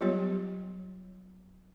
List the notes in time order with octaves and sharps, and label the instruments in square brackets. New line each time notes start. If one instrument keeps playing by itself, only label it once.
[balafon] F#3 G3 B3 F4 G4 C#5